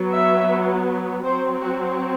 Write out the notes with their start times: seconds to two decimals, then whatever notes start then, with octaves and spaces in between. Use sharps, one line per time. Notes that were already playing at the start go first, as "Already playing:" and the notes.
Already playing: F#3 B3
0.12 E5
1.24 F#3 C4 C5
1.62 F#4